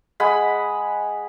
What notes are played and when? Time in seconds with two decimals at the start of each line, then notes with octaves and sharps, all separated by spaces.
0.20 G#3 F#5 G#5 B5